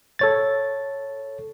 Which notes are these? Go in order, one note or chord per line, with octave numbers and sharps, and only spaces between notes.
A4 C#5 A6